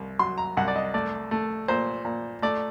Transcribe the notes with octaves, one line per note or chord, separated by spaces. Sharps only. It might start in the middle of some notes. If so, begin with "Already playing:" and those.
Already playing: C2
F#3 C6
A#5
C2 F#5
D5
D#5
A3 D5
A3
A#2 C5
A#2
A3 D5